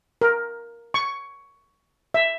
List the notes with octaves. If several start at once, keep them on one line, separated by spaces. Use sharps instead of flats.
A#4
C#6
E5